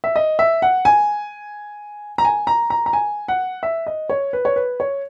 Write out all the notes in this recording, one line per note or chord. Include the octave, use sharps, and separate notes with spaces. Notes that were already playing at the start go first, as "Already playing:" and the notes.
E5
D#5
E5
F#5
G#5
A#5
G#5
A#5
A#5
A#5
G#5
F#5
E5
D#5
C#5
B4
C#5
B4
C#5